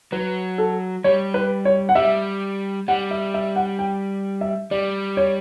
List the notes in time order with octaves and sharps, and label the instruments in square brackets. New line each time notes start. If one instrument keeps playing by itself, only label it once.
[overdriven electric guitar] F#3 [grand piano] B4
[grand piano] A4
[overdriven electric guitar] G3 [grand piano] C#5
[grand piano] B4
C#5
F#5
[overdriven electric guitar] G3 [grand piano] E5
[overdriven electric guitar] G3 [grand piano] F#5
[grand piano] E5
E5
F#5
G5
E5
[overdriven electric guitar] G3 [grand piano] D5
[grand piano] C#5